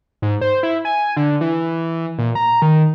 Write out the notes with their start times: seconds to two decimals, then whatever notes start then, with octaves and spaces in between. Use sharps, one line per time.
0.22 G#2
0.41 C5
0.63 E4
0.85 G#5
1.17 D3
1.41 E3
2.19 A#2
2.35 A#5
2.62 D#3